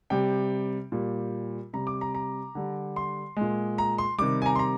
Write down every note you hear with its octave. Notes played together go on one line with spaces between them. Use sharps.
C3 G3 G5
A#2 G3
C3 G3 A#5
D6
A#5
A#5
D3 G3
C6
A#2 G#3
A#5
C6
C3 D#3 G3 D6
G#5
A#5
C6
A#5